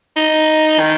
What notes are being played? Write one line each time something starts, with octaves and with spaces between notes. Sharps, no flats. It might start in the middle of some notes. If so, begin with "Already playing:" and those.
D#4
D#3